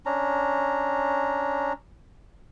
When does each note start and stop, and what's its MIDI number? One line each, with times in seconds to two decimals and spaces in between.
0.06 1.73 61
0.06 1.73 62
0.06 1.73 82